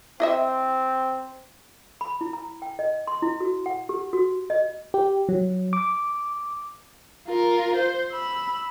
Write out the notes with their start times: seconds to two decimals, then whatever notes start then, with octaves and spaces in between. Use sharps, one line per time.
0.20 C4 E4 D#5 E5
2.01 B5
2.21 E4
2.33 A#5
2.62 G5
2.79 D#5
3.07 C6
3.22 E4
3.41 F#4
3.66 F#5
3.89 G4
4.13 F#4
4.50 D#5
4.94 G4
5.29 F#3
5.73 D6
7.28 F4 A#4
7.76 C5
8.12 B5 E6